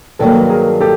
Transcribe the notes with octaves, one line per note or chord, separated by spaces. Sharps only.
G2 D#3 F#3 A#3 A4 B4
B4
G#4 A#4
G4 A4